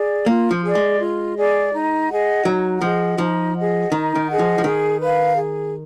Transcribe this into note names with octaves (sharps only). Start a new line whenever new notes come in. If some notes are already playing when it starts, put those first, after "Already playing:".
Already playing: G#4 D5
A#3 F4
F3
G#4 D5
G#3
F4
G#4 D5
D#4
G#4 D#5 F#5
F#3 D#4
F3 G#4 D#5 F#5
F3 D#4
G#4 D#5 F#5
D#3 D#4
D#3
G#4 D#5 F#5
F3
F3
D#3 G#4
B4 F5
G#4